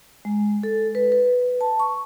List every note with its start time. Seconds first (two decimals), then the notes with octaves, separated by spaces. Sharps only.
0.25 G#3
0.63 A4
0.95 B4
1.12 B4
1.61 A5
1.80 C#6